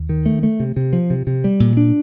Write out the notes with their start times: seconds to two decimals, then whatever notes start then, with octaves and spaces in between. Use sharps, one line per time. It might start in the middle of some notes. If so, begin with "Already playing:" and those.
Already playing: D#2
0.09 D#3
0.26 A3
0.43 A3
0.60 C3
0.76 C3
0.93 F3
1.10 C3
1.27 C3
1.44 G3
1.60 A#2
1.77 D4